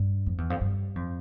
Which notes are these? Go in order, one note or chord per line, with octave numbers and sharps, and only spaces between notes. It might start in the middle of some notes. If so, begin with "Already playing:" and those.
Already playing: G2
F2
E2
F2
G2
F2